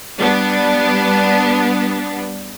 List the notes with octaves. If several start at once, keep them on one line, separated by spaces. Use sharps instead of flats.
G3 B3 D4